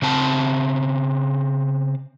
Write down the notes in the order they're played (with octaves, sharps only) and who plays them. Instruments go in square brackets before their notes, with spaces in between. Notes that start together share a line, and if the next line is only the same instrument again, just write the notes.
[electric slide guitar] C#3 C4 A5